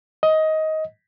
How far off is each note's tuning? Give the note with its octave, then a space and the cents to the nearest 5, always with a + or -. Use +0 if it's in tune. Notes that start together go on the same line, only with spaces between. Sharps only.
D#5 +15